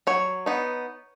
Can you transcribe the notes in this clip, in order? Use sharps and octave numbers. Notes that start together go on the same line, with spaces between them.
F#3 C#5
B3 D#4